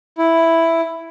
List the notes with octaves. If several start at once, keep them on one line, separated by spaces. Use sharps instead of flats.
E4